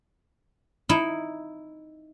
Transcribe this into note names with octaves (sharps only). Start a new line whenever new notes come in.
D#4 E4